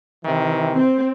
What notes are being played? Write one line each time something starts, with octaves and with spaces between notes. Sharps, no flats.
C3 D#3 E3
C4